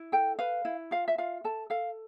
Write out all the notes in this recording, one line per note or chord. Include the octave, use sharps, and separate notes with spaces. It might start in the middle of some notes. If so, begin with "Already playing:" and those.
Already playing: E4
A4 G5
B4 F5
E4
F4 F5
E5
F4 F5
A4 A5
A4 F5